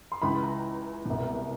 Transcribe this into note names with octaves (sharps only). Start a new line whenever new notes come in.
C6
C#2 C#3 E3 B5
A#5
C2 B2